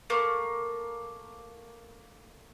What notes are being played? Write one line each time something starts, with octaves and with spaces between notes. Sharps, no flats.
A3 A#3